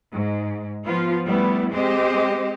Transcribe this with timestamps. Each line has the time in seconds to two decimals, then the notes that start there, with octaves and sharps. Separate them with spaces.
0.11 G#2
0.84 F3 B3 F4
1.26 G3 A3 B3 E4
1.72 G#3 C4 G4 C5 D#5